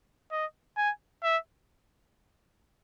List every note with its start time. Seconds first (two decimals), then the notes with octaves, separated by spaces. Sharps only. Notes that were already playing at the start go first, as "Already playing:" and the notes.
0.32 D#5
0.77 G#5
1.23 E5